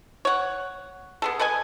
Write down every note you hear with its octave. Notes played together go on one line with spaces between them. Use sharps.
C#5 F#5
B3 G#4 A4
A4 B4 D#5 G#5